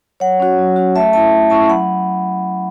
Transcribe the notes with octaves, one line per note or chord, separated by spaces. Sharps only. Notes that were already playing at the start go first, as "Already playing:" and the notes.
F#3 C#5 F#5
C#4 F#4
F#3
C#4 F#4
A3 E5 A5
C#4 E4 E5 A5
A3
C#4 E4 A5 C#6
F#3 F#5 B5